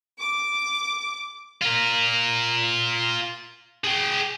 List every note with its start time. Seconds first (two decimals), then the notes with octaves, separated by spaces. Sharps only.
0.19 D6
1.61 F4 A#4
3.84 G#4 G5